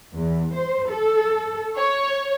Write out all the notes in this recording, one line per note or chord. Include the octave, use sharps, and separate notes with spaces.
E2
C5
A4
C#5